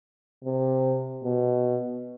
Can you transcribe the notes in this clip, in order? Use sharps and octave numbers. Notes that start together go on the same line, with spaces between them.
C3
B2